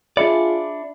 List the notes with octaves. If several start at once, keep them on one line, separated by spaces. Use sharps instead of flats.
D4 F4 G#4 D5 E5 B5 C#7